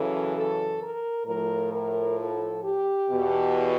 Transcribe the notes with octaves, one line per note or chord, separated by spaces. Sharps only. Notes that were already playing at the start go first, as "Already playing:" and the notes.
Already playing: F#2 C#3 E3 A4
A4
A#4
A2 F3 A#4
A#4
A4
G4
E2 B2